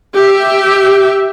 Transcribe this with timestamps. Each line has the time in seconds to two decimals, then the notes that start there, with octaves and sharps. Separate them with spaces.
0.14 G4 E5